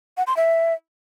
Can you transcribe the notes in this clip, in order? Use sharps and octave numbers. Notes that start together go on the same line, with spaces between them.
F#5
C6
E5